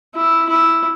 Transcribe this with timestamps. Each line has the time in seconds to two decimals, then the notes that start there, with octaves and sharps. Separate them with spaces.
0.14 E4
0.49 E4